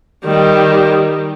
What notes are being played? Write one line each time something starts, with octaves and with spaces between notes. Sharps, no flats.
D#3 G3